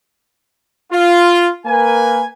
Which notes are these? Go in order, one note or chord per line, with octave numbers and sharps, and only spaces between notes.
F4
A#3 A#4 B4 G#5